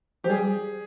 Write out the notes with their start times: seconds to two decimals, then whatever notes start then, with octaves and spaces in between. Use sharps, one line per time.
0.24 F3 G4
0.29 G3 G#4